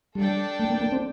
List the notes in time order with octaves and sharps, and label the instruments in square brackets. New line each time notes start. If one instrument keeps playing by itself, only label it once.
[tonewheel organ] G3 [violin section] D4 A4 D5 G5
[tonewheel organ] A3
A#3
A#3
C4